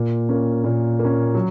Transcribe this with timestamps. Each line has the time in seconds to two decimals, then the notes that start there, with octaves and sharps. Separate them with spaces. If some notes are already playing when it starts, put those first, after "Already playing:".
Already playing: A#2
0.29 A#3 C#4
0.64 A#2
0.99 A#3
1.05 C#4
1.35 F#3